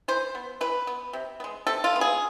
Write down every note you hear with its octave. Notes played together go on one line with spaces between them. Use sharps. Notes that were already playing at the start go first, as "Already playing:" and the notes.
E3 C5
B3
E3 B4
B3
C3
B3
G#3
C3 A4
F4
G#3 B3
G#4